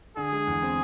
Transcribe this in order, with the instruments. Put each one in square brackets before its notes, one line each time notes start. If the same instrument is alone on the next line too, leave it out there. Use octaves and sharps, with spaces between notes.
[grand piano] D3 [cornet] G#4
[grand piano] G#3
E2
C4